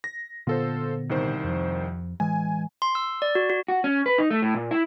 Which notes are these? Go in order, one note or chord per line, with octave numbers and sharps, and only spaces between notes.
A#6
A#2 D3 B3 F4 A4 C5
C2 D#3 C5
F2 F3
A2 E3 G#3 G#5
C6
E6
D5
F#4
F#4
F#4
C#4
B4
D#4
A3
A2
A#2
E4